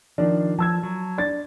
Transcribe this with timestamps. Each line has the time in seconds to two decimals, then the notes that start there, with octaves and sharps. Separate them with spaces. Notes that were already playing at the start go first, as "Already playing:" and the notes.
0.18 D#3 F3 D4
0.59 F3 A5 E6 G#6
0.83 F#3
1.18 D4 A6